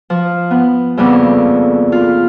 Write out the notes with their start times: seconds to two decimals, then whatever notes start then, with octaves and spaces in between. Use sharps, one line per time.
0.10 F3
0.51 B3
0.97 F2 C#3 G3 A#3 B3 A4
1.92 F4